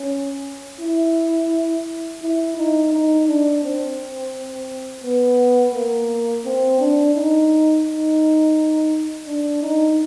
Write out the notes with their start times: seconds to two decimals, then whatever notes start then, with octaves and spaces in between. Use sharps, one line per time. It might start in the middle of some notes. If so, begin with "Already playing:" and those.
Already playing: C#4
0.81 E4
2.22 E4
2.57 D#4
2.93 D#4
3.28 D4
3.64 C4
5.04 B3
5.74 A#3
6.45 C4
6.80 D4
7.15 D#4
7.86 D#4
9.27 D4
9.62 D#4